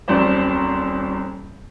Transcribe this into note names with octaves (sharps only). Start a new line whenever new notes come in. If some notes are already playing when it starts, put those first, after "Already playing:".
D#1 C2 F#3 C4 C5 D5